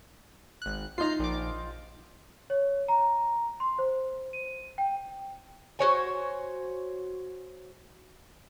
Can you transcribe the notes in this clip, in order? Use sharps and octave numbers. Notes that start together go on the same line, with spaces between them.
G#1 F#6
D#4 F4 A#5 G6 C7
A#1 D6
C#5
A#5
C6
C5
D#7
G5
F#4 C5 C#5 G#5